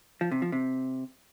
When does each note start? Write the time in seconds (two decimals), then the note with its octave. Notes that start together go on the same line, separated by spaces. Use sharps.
0.21 F3
0.31 C3
0.42 F3
0.52 C3